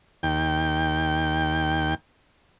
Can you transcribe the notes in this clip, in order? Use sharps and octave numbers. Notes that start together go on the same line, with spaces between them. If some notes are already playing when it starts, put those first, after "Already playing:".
D#2 G5